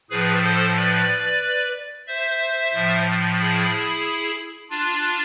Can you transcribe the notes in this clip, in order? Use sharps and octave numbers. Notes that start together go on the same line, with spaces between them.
A2 F3 G#4 B4
A4 C5
B4 D5
C5 E5
A2 F3
E4 G#4
D4 F4